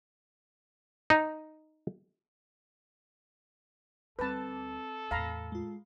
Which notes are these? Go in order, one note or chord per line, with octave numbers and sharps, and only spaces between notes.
D#4
D2 G3 C4 A4 B4 A5 D6
E2 A2 F5 A#5 B5
G#3 F4